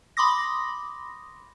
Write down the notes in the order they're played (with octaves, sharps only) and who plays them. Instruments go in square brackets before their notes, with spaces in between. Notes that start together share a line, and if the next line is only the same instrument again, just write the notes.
[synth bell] B5 C6 D6 D#6 A#6